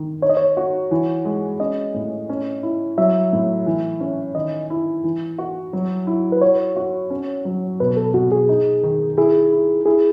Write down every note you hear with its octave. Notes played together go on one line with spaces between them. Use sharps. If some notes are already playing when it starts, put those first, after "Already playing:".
Already playing: D#3
D#4 C#5
D#5
C#5
F#4
E3
G#3
C#4 D#5
A2
C#4
E4
F#3 E5
A2
E3
C#4
D#3 D#5
E4
E3
F#4
F#3
E4
B4
F#4 C#5
F#4
C#4
F#3
B2 B4
A4
B2 F#4
G#4
D#4
D#3
E4 G#4
E4
E4 G#4